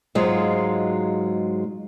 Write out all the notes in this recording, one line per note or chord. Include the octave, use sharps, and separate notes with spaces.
G#2 F#3 G#3 F4